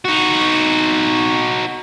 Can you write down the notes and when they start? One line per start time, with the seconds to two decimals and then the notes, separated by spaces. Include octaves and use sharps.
0.05 D#4 F#4